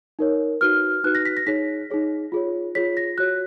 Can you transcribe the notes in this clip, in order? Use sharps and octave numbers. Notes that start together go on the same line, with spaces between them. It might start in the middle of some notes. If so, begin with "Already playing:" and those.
D#4 A#4 C#5
D#4 F#4 B4 F6
D#4 F#4 B4 F#6
A#6
B6
A#6
D#4 G#4 C#5 B6
D#4 G#4 C#5
F4 G#4 C#5
F4 G#4 C#5 B6
A#6
F#4 C#5 F#6